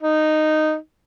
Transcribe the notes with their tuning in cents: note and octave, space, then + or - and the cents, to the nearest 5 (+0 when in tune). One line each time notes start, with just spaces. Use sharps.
D#4 -10